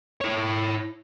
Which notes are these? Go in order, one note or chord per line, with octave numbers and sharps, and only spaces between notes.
E4 C#5